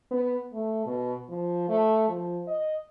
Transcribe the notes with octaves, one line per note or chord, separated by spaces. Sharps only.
B3
A3
B2
F3
A3
F3
D#5